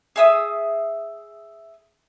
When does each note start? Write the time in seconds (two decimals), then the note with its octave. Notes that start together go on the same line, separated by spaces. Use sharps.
0.16 G#4 E5 D#6